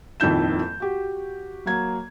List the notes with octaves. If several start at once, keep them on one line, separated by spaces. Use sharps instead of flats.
D#1 F2 D#3 E4 G6 E7
F#4 G4
F#3 A#3 G#6